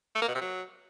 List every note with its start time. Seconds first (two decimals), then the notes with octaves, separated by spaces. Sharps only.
0.15 A3
0.22 A#3
0.28 B2
0.35 C3
0.41 F#3